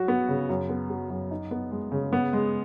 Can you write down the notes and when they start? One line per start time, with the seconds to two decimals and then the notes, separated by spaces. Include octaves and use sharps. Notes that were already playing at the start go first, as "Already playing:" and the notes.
Already playing: F#3 F#4
0.08 B3
0.29 C#3
0.49 F#2
0.69 B3
0.90 F#3
1.10 F#2
1.31 D#4
1.51 B3
1.71 G#3
1.92 C#3
2.13 B3
2.33 G#3